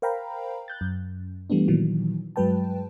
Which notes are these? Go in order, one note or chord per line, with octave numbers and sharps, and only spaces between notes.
A#4 C5 F5 G5 A#5 B5
F#6 G6 A6
F#2
E3 G3 A3 B3 D4
A#2 D#3 E3 F#3
G2 F#3 G#3 B4 G5 A5